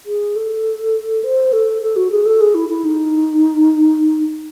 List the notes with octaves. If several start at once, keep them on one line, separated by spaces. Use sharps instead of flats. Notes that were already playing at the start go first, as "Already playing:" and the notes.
G#4
A4
C5
A4
A4
F#4
G#4
A4
G#4
E4
E4
D#4